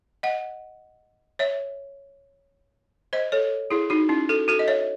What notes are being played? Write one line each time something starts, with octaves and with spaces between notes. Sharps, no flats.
D#5 F#5
C#5 E5
C5 D#5
A4 C#5
E4 G#4
D#4 F#4
C#4 E4
F#4 A4
F#4 A4
D#5
C#5 E5